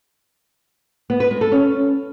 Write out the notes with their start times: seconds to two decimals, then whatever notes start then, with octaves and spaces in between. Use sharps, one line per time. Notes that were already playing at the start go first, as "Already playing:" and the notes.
1.10 B3
1.20 B4
1.31 G#3
1.41 A4
1.52 C#4